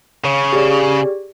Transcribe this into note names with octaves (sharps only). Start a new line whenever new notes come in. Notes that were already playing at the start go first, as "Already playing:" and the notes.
C#3 C#5
G4 G#4 D5